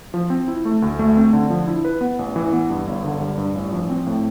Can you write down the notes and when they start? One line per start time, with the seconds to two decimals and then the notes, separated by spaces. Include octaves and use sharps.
0.14 F3
0.30 C4
0.48 E4
0.65 A3
0.82 D2
0.99 A3
1.17 C4
1.33 D3
1.50 F3
1.67 E4
1.85 B4
2.01 B3
2.19 A1
2.36 E3
2.53 B3
2.70 G2
2.87 G1
3.04 D3
3.21 G3
3.38 G2
3.55 A1
3.73 F3
3.90 C4
4.06 A2